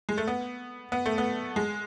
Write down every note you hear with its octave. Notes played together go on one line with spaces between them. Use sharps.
G#3
A3
B3
B3
A3
B3
G#3